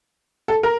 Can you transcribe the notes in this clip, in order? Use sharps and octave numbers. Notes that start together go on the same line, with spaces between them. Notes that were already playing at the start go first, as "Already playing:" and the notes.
A4
A#4